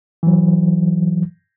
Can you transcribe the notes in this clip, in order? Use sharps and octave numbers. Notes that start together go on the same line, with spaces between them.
E3 F#3